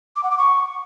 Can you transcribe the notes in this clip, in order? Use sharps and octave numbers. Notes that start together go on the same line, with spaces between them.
D6
F#5
D6
C#6